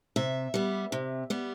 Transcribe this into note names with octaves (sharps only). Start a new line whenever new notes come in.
C3 E5
G3 B3
C3
G3 B3